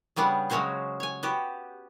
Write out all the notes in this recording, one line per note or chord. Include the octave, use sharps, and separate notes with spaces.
C#3 G3 B3 D4 F#5
C#3 F#3 G#3 C#4 F#4 C5
C#5 G#5
B3 F#4 G4